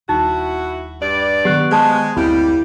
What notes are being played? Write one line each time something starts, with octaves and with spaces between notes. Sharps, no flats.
D#1 D#4 E4 F#4
G2 D5
D#3 F#3 B3 G4 C#6 F#6
G#3 C5 A5 C6
F#1 D2 G3 A#3 C4 E4 G4